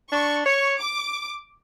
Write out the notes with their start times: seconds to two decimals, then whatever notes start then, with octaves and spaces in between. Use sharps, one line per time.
0.12 D4 C#6
0.46 C#5 C#6
0.79 D6